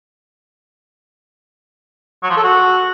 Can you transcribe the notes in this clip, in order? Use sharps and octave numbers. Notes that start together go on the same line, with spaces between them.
F#3
F3
A4
F#4